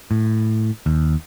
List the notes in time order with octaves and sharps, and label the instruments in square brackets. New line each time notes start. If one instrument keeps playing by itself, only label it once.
[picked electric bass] A2
D#2